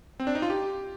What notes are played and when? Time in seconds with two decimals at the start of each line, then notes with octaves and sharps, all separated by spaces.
0.20 C4
0.27 D4
0.35 D#4
0.42 F4
0.50 G4